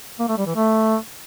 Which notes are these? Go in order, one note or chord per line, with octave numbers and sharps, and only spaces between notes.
A#3
A3
G3
E3
A3